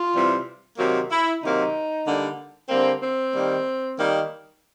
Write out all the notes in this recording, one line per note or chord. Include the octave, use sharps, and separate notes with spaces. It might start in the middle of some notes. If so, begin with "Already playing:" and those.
Already playing: F4
C3 E3 G3
C3 D#3 F#3 A#3 F#4
E4
C3 D#3 F#3 A#3 D#4
D3 G3 A#3
D3 G3 A#3 C4
C4
D#3 G3 A#3
D#3 G3 A#3